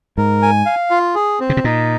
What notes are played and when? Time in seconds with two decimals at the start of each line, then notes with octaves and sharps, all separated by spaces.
0.18 G#2 A#4
0.42 G#5
0.66 F5
0.91 F4
1.15 G#4
1.40 C4
1.50 C#3
1.57 C3
1.64 A#2 D#4